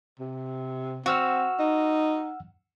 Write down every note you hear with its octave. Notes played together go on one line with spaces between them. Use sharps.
C3
C4 F#4 F#5 E6 F6
D#4